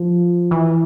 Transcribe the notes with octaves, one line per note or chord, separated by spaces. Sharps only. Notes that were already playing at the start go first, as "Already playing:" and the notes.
Already playing: F3
E3